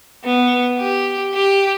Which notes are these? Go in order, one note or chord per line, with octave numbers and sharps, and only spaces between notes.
B3
G4
G4